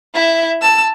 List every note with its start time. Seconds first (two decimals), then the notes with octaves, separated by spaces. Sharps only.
0.14 E4 E5
0.61 A5 E6